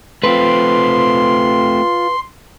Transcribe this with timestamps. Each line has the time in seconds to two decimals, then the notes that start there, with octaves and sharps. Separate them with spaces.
0.24 A3 C4 F4 B4 C6